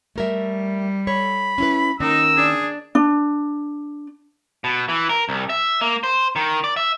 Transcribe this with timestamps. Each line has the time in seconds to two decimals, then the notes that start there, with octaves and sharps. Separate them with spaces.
0.16 G3 A3 A#4 E5
1.07 A4 C#5 B5
1.58 C#4 E4 B4
2.00 D#3 A#3 C#4 D#4 A#4 E6
2.37 D4 G#4
2.95 D4
4.64 B2
4.89 E3
5.09 A#4
5.29 C2
5.50 E5
5.81 A#3
6.03 C5
6.36 D#3
6.64 D5
6.77 E5